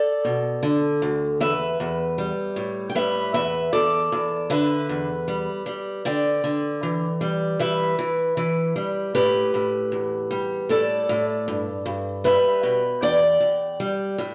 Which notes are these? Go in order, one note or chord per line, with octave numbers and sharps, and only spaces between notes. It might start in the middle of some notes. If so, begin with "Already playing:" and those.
Already playing: A4 D5
B2
D3
D2
E2 B4 E5
E2
G3
A2
G5
G3 B4 E5
E2 B4 E5
E2 A4 D5
E2
D3 B4 E5
E2
G3
G3
D3 D5 G5
D3
E3
G3
E3 B4 E5
E3
E3
G3
A2 G4 B4
A2
E2
G3
A2 A4 D5
A2
G2
G2
G3 B4 E5
B2
E2 D5 G5
E2
G3
A2